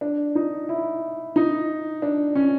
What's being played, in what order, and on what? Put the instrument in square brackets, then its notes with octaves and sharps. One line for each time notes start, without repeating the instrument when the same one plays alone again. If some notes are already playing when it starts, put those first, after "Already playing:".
[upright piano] D4
D#4
E4
D#4
D4
C#4